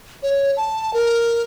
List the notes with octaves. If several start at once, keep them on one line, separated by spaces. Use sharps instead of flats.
C#5
A5
A#4